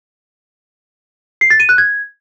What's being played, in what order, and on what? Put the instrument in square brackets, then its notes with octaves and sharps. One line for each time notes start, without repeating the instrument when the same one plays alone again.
[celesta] C7
A6
D#7
F#6
G#6